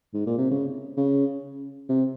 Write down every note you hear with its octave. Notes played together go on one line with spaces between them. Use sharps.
G#2
A#2
C3
C#3
C#3
C3